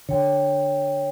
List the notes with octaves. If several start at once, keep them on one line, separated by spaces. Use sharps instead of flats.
D3 C#5 G5